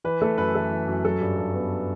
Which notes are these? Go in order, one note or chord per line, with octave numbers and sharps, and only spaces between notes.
E3 B4
A3 A4
F#2 B4
E3 A4
E3
F#2
F#3 A4
G2
G2
B3